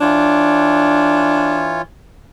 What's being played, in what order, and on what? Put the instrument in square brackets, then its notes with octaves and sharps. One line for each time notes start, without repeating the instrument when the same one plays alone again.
[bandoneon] E3 F4 C#5 [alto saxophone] D4